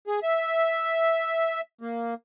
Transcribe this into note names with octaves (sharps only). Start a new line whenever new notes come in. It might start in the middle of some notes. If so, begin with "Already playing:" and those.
G#4
E5
A#3